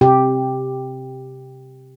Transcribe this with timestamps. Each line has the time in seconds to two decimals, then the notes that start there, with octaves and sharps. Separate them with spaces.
0.01 C3 G4